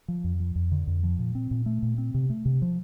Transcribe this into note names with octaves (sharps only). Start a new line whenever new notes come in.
F3
F2
F3
F2
D3
F2
F3
A#2
C4
A#2
A3
A#2
C4
C3
A3
C3
F3